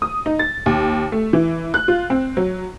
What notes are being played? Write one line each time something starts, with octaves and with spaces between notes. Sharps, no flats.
D#6
D#4
A6
D#2
A3
E3
F#6
F4
C4
F#3